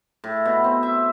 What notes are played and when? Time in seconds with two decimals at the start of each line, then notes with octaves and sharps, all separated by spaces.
0.24 A2
0.45 B2
0.64 C4
0.83 E5